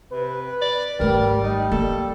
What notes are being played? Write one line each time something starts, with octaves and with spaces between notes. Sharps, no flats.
C3 B4
D5
G#1 G3 A3 A#4
G3 D#4
A#3 A4